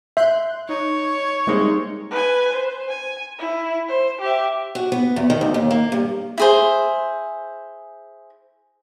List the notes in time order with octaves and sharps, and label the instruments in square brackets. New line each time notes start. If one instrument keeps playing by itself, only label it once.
[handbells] E5 [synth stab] C6 F#6 G6
[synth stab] D#4 [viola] C#5
[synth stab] G3 A#3 C4 [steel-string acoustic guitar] G#3 D#4
[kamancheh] B4 G#5
C5
G#5
E4
C5
G4 E5
[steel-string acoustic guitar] F#4
B3
E2
D#3
D2
D#2
A#3
G2
[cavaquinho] E4 G#4 C5